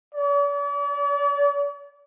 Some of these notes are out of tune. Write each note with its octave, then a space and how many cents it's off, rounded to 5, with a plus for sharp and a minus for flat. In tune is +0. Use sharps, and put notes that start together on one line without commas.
D5 -45